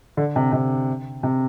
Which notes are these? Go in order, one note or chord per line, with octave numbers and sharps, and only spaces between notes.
D3
C3
C3
C3